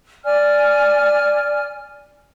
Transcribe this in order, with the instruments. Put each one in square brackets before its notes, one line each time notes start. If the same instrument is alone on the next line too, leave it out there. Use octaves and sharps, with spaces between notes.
[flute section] D5 G#5 F6